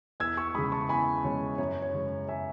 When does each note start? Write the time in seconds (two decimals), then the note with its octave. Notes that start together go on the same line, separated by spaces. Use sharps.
0.20 E2 E6 G#6
0.37 C#6 E6
0.55 C#3 G#3 B5 D#6
0.72 A5 C#6
0.89 E2 G#5 B5
1.24 C#3 G#3 C#5
1.58 F#2 C#5
1.82 C#5
1.94 C#3 G#3 C#4
2.29 E5 G#5